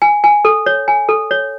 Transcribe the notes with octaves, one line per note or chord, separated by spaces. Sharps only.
G#5
G#5
A4
C#5
G#5
A4
C#5